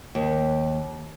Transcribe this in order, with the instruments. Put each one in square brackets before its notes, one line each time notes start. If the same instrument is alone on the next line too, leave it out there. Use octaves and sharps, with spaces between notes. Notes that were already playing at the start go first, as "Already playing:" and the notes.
[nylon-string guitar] D#2